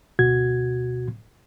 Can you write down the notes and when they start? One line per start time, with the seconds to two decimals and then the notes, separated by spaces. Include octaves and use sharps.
0.19 D2 B2 F#4 G#6